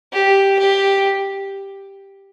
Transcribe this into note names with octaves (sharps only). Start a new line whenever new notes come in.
G4
G4